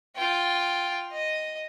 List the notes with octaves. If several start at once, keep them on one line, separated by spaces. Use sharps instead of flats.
F4 G5
D#5